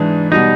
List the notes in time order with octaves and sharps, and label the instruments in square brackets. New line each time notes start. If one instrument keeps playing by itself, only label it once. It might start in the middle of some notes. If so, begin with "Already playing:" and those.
Already playing: [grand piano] G#2 E3 G#3 [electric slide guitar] D4
[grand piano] B2 G3 [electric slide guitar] D#4